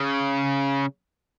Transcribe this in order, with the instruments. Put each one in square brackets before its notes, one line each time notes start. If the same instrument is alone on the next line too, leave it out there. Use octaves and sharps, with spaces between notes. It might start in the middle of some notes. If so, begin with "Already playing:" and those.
Already playing: [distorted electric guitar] C#3